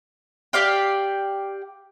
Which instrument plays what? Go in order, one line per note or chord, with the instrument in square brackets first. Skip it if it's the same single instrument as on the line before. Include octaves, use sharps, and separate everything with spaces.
[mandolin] G4 D5 F5 G5